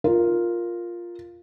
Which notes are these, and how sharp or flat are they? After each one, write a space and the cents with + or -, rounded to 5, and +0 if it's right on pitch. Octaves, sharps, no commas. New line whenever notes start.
F4 +0 A#4 +0